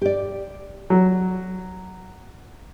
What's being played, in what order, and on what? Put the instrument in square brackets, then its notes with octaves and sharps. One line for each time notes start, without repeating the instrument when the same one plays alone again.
[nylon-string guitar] G4 D5
[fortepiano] F#3